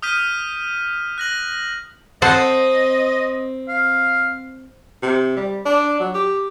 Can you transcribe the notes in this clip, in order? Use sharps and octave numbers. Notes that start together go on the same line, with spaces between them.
D#6 F6 G6 B6 D#7
F#6 A#6 F#7
C4 A4 C5 D#5 F#5
F5
C3
G3
D4
F#3
G4